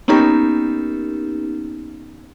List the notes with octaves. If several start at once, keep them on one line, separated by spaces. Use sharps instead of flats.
A#3 B3 C#4 D#4 G4 A#4